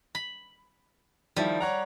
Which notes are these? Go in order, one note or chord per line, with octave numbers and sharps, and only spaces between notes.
B5
D#3 F3 G3 E4
C#5 F#5 A#5